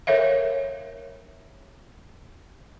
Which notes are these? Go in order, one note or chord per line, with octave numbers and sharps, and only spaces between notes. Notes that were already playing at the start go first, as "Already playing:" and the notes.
A4 A#4 C#5 E5 F5